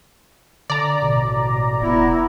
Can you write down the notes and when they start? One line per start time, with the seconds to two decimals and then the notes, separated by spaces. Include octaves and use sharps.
0.70 D3 D5 A#5
1.02 A1 B2
1.81 E1 B3 E4